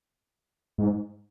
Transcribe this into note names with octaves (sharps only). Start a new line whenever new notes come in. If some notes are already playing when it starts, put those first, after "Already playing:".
G#2